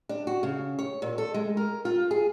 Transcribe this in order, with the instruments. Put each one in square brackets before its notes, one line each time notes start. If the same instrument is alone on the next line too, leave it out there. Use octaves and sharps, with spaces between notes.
[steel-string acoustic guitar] D4
F#4
C#3
C#5
A#2
A4
G#3
A#4
F4
G#4